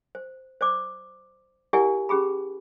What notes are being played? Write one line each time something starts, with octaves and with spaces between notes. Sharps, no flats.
C5
C5 D5 D6
E4 G4 A#4 D5 F#5 G#5
C#4 G4 G#4 B5